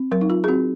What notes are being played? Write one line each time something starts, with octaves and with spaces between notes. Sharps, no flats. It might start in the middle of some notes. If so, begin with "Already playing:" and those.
Already playing: C4
F#3 A#4
D#4
F4
G#4
C4 F#4